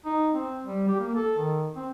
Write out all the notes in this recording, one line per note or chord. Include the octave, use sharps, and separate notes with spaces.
D#4
C4
G3
G4
A#3
A4
D#3
C4